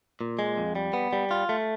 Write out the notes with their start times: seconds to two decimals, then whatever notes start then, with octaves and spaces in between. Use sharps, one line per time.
0.21 A#2
0.39 G#3
0.58 F2
0.75 G3
0.93 B3
1.13 G3
1.31 F4
1.49 A3